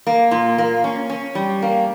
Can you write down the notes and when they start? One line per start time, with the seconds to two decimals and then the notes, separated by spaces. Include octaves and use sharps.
0.07 A#3
0.31 A#2
0.58 A#3
0.84 C#4
1.10 C#4
1.35 G3
1.62 A#3